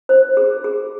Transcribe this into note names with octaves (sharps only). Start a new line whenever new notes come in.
C5
G#4
G#4